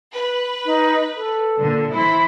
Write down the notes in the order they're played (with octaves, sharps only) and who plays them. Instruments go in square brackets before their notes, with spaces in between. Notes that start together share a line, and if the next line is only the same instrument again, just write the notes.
[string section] B4
[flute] D#4
A4
[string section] A#2 D3
[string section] E3 E4 C5 [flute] B5